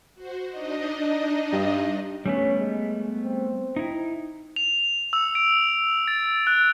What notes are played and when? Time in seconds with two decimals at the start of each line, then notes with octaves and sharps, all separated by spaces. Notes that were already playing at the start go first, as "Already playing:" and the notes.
0.15 F#4 C5
0.49 D4 D#4 D#5
1.52 G2
2.26 G3 A3 B3 C#4
2.60 G#3
3.25 C4
3.76 D#4 E4
4.56 F7
5.13 E6
5.35 D7
6.08 A6
6.47 F#6